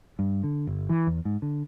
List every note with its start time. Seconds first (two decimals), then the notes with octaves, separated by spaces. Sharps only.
0.19 G2
0.44 D3
0.67 G1
0.89 E3
1.07 E2
1.25 G#2
1.42 D3